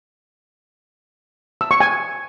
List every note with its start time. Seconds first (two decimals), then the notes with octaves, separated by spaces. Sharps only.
1.61 E6
1.71 C#6
1.80 G#5